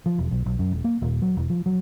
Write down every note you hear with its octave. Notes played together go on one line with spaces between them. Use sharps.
F3
E1
B1
B1
F#2
E1
A#3
D#1
F#3
E1
F3
F#3